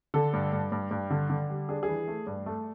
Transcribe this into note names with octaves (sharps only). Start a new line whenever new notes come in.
D3 A4
G2
G2
G2
G2
D3
D3
G3
D4 G#4
G#4
E3
A3
G2
A3